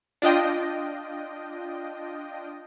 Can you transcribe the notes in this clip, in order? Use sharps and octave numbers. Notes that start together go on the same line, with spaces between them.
D4 F4 D#5 G5